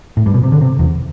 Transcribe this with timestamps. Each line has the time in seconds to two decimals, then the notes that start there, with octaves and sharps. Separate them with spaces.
0.17 A2
0.26 G2
0.34 B2
0.43 C3
0.52 D3
0.61 C3
0.79 E2